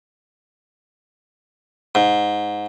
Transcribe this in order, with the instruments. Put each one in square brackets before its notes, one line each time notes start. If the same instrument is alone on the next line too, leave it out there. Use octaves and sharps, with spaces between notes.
[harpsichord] G#2